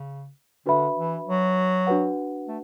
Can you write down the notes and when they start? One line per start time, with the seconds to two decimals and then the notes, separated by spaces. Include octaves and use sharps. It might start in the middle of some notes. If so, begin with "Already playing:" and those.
Already playing: C#3
0.66 D3 D4 F#4 B4 E5 B5
0.96 E3
1.27 F#3
1.87 D4 F#4 B4 F#5
2.47 A3